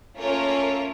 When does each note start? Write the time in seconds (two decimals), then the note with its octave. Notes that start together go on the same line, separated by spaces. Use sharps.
0.18 A3 A#3 C#4 F4 A#4 C#5